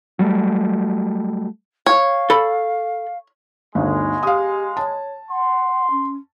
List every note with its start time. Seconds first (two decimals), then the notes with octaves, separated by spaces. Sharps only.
0.19 F#3 G3 A3
1.86 C#5 F5
2.30 A4 B5
3.75 G1 D2 G#3 D#4
4.23 G4 F5 D#6
4.77 C#5 A5
5.30 F#5 C6
5.91 C#4